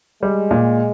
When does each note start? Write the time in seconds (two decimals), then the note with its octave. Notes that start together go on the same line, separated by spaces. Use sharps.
0.22 G3 G#3
0.51 A#2